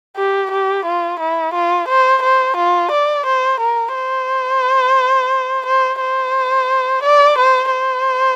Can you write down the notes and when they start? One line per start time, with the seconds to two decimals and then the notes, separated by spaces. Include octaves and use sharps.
0.17 G4
0.52 G4
0.86 F4
1.20 E4
1.54 F4
1.89 C5
2.23 C5
2.57 F4
2.92 D5
3.26 C5
3.60 A#4
3.95 C5
5.66 C5
6.01 C5
7.04 D5
7.39 C5
7.72 C5